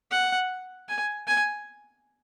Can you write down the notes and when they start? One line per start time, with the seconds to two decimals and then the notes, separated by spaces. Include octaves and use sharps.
0.11 F#5
0.89 G#5
1.28 G#5